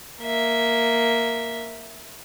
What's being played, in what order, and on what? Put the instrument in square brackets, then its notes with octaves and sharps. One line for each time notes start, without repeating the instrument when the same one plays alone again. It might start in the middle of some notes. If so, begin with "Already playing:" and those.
[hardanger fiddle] A#3 E5